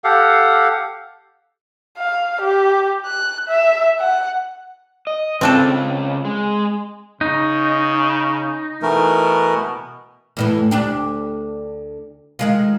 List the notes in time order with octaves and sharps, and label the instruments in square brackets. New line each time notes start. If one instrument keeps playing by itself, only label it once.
[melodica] G4 A4 F5 F#5
[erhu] F5
G4
F#6
E5
F#5
[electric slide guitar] D#5
[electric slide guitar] C#3 F4 [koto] C4 D4 A4
[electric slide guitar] G#3
[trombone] C#3 [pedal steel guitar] D#4
[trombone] B2 [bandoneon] E3 A3 A#4
[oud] E2 A2 E3
D2 D4 G4
D#3 G#3 F4